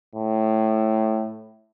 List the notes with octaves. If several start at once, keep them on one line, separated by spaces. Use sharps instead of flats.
A2